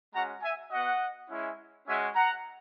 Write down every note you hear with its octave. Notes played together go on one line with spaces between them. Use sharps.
G#3 C#4 F#4 F#5 A#5
E5 G#5
B3 F#4 D#5 F#5
G#3 C#4 E4
G#3 C#4 F#4 E5 G#5
F#5 A#5